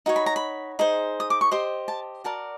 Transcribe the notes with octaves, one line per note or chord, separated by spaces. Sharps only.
D#4 F#4 C#5
B5
A#5
B5
D#4 G#4 C5
D#6
D6
C#6
G4 C5 D#5 C6
A5
F#4 A#4 D5 A5